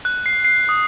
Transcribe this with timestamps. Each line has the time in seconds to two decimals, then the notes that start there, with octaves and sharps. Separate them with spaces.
0.05 F#6
0.26 C7
0.45 C7
0.69 D#6